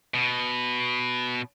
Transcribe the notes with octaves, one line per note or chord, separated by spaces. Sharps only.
B2